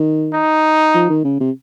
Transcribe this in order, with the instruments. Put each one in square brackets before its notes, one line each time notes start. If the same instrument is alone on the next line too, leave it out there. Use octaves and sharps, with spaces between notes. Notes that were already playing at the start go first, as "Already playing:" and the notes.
Already playing: [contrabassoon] D#3
[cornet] D#4
[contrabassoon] F3
D#3
C#3
C3